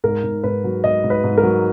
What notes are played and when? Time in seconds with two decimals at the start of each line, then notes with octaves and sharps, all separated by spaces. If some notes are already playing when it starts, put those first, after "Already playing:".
0.04 G#2 A#4
0.24 G#2
0.43 G#2 B4
0.64 F#3
0.84 G#2 D#5
1.04 G#2
1.10 B4
1.24 G#2
1.38 A#4
1.43 F#3